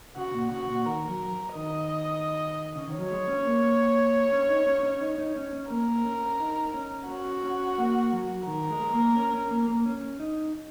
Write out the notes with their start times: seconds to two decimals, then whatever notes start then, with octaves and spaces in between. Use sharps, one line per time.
0.16 C#3 F#4
0.34 A#2
0.51 C#3 F#4
0.69 A#2
0.86 D#3 A#4
1.09 F#3
1.55 D#3 D#5
2.76 C#3
2.87 D#3
2.93 C#5
2.99 F#3
3.11 G#3
3.27 C#4
3.39 C#4
3.45 A#3
4.32 C#4
4.49 D#4
4.67 C#4
4.78 D#4
4.83 C#4
5.01 D#4
5.18 D#4
5.36 C#4
5.53 C#4
5.70 A#3 A#4
6.05 C#4
6.40 D#4
6.74 C#4
7.08 C#4 F#4
7.44 C#4
7.78 A#3
8.13 F#3
8.47 D#3 A#4
8.70 G#3
8.82 G#3
8.93 A#3
9.16 C#4
9.34 C#4
9.51 A#3
9.68 A#3
9.86 C#4
10.20 D#4